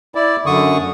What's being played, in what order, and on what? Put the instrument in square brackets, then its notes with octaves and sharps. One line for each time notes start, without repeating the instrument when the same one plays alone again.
[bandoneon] E4 D5
F#2 D3 C#6 D#6